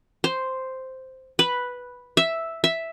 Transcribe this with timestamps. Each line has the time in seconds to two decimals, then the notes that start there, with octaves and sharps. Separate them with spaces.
0.24 C5
1.39 B4
2.17 E5
2.64 E5